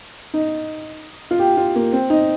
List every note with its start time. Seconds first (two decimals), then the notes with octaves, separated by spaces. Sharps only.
0.34 D#4
1.31 F4
1.39 G4
1.57 F4
1.76 A#3
1.93 C4
2.10 D#4